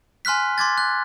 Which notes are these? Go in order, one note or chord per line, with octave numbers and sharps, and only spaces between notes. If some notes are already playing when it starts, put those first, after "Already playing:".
G#5 C6 F6 F#6 B6
C6 D6 G#6 A6
F#6